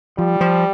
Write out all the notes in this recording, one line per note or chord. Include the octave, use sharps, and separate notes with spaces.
F3 G3
F3